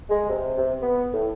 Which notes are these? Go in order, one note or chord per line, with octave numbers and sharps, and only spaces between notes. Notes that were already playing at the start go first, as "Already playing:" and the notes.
G#3
C3
C3
B3
A2